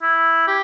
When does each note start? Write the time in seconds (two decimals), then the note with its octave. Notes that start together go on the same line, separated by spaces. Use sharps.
0.03 E4
0.47 G4